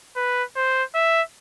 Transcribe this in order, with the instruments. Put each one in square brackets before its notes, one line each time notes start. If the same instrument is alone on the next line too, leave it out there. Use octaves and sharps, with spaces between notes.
[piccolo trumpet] B4
C5
E5